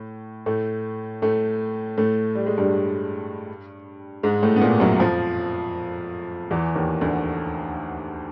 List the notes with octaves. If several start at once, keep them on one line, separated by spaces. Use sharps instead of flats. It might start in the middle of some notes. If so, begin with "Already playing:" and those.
Already playing: A2
A2 A3
A2 A3
A2 A3
G3
G#3
G2 G3
G#2 G#3
A2 A3
B3
A#2 A#3
F#2 F#3
F2 F3
E2 E3
D#2 D#3
D2 D3